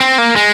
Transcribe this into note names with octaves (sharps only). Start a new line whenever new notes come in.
C4
A#3
G#3